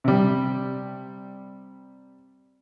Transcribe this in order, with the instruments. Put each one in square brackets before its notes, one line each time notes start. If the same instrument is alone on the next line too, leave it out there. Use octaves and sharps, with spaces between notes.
[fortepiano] C3 G3